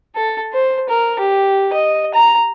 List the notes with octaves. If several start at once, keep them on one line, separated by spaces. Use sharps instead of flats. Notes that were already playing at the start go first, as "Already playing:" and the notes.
A4
C5
A#4
G4
D#5
A#5